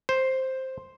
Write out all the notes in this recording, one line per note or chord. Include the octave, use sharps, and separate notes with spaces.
C5